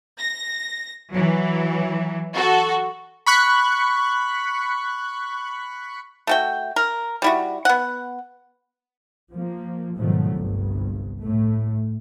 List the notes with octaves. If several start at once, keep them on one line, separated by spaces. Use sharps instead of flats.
A#6
E3 F#3
F#4 A4
B5 C#6 F#6
A3 F#4 G5
A#4
G3 E4 F#4
B3 F#5
F3 A#3
G#2 B2 D#3 F3 F#3 A3
G1 C2 G2
A2 A3